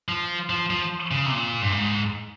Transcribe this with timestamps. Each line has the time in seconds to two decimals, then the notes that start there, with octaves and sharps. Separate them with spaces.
0.09 F3
0.50 F3
0.70 F3
1.11 C#3
1.26 C3
1.32 A#2
1.62 G2
1.72 G#2